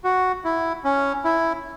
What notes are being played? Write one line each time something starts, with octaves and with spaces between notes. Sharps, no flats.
F#4
E4
C#4
E4